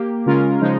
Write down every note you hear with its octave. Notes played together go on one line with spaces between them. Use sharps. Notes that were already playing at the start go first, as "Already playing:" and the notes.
Already playing: A#3 G4
C#3 G#3 C#4 F4 A#4
C#3 F3 G#3 D#4